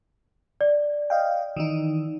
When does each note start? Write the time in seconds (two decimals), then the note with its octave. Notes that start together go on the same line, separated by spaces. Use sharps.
0.61 D5
1.10 D#5 F5 G5
1.56 D#3 E3 D#4